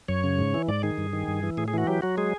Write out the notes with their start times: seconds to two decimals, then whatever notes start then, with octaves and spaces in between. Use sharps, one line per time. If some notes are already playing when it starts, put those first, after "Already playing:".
0.08 F#2 C#5
0.24 C#3
0.39 G#2
0.54 E3
0.68 G#2 D5
0.83 D#3 G#4
0.98 G2
1.13 D#3
1.28 G2
1.43 E3
1.57 A2 G#4
1.68 G#4
1.74 E3 F#4
1.87 F#3 G4
2.02 F#3 F#4
2.17 G#3 G#4